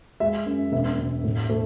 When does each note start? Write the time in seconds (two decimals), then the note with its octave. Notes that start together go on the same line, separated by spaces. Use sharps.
0.20 G#3 E5
0.46 F#2
0.72 E1 E5
0.99 E1
1.24 A2
1.49 A3